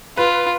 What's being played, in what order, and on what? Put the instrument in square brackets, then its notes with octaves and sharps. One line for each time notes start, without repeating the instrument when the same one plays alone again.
[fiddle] F4 [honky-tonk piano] B4